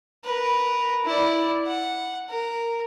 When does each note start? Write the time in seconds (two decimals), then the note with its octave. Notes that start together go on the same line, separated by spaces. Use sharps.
0.24 A#4 B4
1.05 E4 D5
1.67 F#5
2.30 A#4